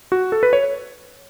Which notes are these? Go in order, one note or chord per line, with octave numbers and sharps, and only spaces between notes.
F#4
A4
B4
C#5